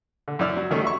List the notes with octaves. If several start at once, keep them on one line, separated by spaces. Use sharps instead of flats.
D3
F#2 E4 D5 E6 F6
F#3
D#3 G3 A3 C#4
F#4 E5 C#6